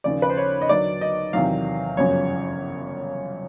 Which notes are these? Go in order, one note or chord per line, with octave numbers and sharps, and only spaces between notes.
D#2 C#3 F3 D5
B4
C5
C#5
D#5
D#2 D3 F#3 D5
D#5
E2 C3 D#3 F#3 F5
G1 F#2 C#3 F3 C#5